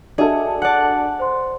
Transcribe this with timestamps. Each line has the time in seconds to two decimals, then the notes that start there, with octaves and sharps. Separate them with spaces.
0.18 D4 F#4 G#4 A4 D#5 E5
0.62 D5 F#5 A5 F#6
1.19 C5 C6